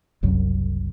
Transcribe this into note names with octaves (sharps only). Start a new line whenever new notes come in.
F#1 C2 F#2